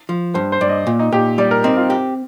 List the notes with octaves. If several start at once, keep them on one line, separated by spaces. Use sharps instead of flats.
F3
G2 C5
C5
G2 D5
D#5
A#2
D#4
A#2 G4
G3 D5
A#4
C4 D#4
F4
G4